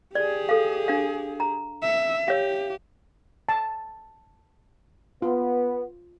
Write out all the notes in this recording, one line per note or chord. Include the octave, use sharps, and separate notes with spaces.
G4 G#4 D5
A4 F5
D4 F5
A#5
E5
G4 C#5 E5 F5
A5
B3 F4